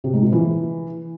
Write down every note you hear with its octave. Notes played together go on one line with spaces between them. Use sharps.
C3
G#2
A#2
E3